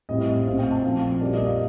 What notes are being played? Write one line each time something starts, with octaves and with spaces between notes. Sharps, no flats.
A2 G3 C4 D#5
D#5
A#2 A3 C4 F5
G5
A5
A#2 F3 A3 C4 F5
A#2 G3 A#3 D5
D#5
F5